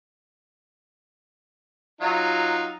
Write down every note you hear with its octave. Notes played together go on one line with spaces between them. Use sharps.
F#3 D#4 F4